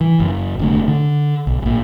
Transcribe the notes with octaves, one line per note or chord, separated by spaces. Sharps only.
E3
F#1
F1 D3 A3
D3
B1
A#1 A#2